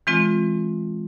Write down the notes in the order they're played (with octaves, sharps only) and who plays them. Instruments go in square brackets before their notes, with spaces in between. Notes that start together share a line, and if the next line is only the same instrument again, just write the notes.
[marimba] E3 G#3 C4 F4